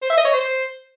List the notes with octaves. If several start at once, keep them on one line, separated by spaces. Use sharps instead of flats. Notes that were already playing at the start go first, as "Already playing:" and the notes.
C5
E5
D#5
C#5
C5